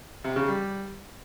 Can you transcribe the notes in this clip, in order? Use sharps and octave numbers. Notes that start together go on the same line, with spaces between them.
C3
C#3
G3